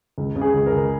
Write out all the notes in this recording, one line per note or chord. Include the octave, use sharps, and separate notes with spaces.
C#2
C#3
G#4
C#2
A#4
C#2